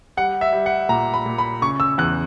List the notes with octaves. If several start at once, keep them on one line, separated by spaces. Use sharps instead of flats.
G3 F#5
E5
G3
F#5
A#2 A#5
B5
A#2
B5
C#3 C#6
E6
E2 F#6